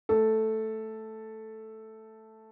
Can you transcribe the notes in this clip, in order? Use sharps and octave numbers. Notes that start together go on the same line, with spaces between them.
A3 A4